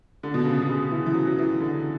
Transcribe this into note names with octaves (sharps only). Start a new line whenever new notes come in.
D3
B2
C#3
B2
C#3
E3
E3
F#3
F#3
E3
D3